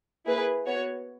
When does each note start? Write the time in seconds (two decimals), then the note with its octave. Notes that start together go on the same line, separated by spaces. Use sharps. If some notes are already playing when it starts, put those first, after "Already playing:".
0.27 A#3 E4 G#4 B4
0.67 B3 F#4 C#5